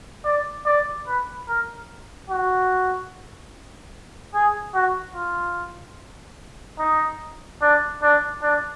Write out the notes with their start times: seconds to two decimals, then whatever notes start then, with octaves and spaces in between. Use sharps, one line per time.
0.25 D5
0.66 D5
1.07 B4
1.48 A#4
2.30 F#4
4.34 G#4
4.74 F#4
5.16 F4
6.79 D#4
7.62 D4
8.03 D4
8.42 D4